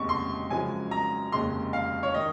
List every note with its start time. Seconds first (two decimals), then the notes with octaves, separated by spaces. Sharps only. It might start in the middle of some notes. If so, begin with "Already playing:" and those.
Already playing: F1 D#2 C#3 G#3 C#6
0.09 C6
0.50 F#2 C#3 F3 G#3 G#5
0.91 A#5
1.32 F1 D#2 C#3 G#3 C6
1.73 F5
2.03 C#5
2.14 D#3 D#5